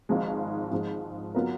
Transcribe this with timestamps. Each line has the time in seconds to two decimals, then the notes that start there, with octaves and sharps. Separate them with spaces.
0.09 G#1 G#2 F3 G#3
0.71 G#2 F3 G#3
1.35 F#3 B3 F4 A#4